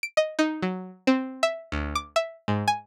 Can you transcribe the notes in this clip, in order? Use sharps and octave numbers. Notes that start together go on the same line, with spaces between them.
D7
D#5
D#4
F#3
C4
E5
D2
D6
E5
G#2
G#5